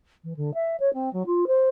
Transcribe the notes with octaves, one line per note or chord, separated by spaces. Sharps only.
E3
D3
E5
C#5
C4
F#3
F4
C5